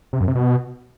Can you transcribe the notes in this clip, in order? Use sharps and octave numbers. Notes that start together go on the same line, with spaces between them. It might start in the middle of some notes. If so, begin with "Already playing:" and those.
C3
F#2
C3
B2